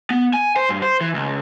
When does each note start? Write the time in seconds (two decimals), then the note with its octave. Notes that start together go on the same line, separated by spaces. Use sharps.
0.10 B3
0.34 G#5
0.56 C5
0.69 G2
0.82 C5
1.01 E3
1.14 C#2